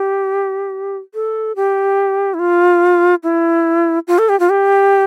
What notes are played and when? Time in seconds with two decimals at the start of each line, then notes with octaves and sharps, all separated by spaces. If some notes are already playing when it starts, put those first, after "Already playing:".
Already playing: G4
1.14 A4
1.56 G4
2.34 E4
2.39 F4
3.23 E4
4.08 F4
4.19 A4
4.29 G4
4.40 F4
4.50 G4